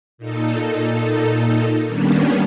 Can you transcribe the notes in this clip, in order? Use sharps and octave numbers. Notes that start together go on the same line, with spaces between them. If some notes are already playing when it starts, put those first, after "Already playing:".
A#2 D#4 A4
D#3 G3 A#3 B3 C#4 D4